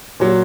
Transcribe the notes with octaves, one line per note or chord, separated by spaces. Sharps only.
A#2 F#3